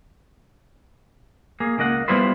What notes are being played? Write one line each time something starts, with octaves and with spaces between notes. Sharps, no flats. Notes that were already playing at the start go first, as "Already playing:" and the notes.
A#3 G#4
C#2 A#3 D#5 F#5
G3 B3 E4 F4 B4 C5